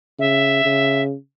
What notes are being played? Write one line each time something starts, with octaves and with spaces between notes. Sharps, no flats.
C#3 E5
C#3